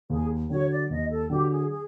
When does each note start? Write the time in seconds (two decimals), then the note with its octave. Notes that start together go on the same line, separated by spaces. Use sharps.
0.10 D#2 G#4
0.50 D3 F#3 C#5
0.69 D5
0.90 D#2 D#5
1.10 A4
1.30 D3 F#3 G4
1.49 G#4
1.70 G#4